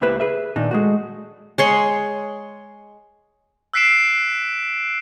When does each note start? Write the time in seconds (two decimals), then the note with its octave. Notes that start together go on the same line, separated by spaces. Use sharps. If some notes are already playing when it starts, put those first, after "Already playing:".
0.01 C#2 A#3 E4 G4 B4 C5
0.20 G#4 B4 E5
0.56 A#2 D#3 D4 D#4
0.71 G#3 A3 F#4
1.58 G#3 C#5 C6
3.74 E6 F#6 B6 C7 D7 E7